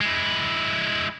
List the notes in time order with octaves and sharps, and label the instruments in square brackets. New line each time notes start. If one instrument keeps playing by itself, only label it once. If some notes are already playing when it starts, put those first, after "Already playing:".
[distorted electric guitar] G#3 E4